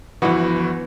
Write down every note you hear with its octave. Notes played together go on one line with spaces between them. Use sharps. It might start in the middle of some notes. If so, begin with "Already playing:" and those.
G1 E3 F3 B3 E4 F#4